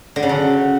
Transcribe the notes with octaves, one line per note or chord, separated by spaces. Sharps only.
D3
C#3
F#3